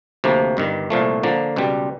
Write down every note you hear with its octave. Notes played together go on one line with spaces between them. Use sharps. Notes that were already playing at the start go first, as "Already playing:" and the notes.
D2 C3 F3 A#3
G1 G2 D#3
C2 A#2 F3 A3
D3 F3 A#3
C#2 B2 G3